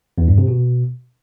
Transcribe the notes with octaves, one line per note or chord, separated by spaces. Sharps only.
E2
G2
C3
B2